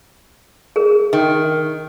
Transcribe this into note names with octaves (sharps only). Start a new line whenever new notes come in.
G#4 A#4
D#3